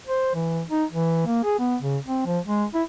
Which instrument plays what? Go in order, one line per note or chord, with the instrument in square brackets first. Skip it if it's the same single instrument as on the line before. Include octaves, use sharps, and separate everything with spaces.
[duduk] C5
E3
D#4
E3
A#3
G#4
B3
C#3
C4
F3
G#3
E4